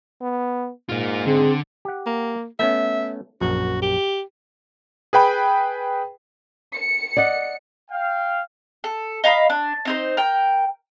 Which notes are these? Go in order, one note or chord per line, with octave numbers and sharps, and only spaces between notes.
B3
G#2 A#3 F4
D3 C4 G#4
G4 F#5
A#3
A3 B3 C#4 E5
A#1 F#2 F#4
G4
G#4 B4 G5 B5
C#7
D5 D#5 F#5
F5 G5
A4
D#5 F5 A#5 B5
D4
C4 D#4 C5
A#4 G5